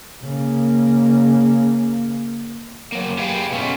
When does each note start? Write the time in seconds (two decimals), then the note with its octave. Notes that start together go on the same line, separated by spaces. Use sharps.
0.22 C#3 A#3
2.92 F#3 A#3
3.18 G4 G#4 B4 F5 G5
3.51 B2 G#3 A3 C#4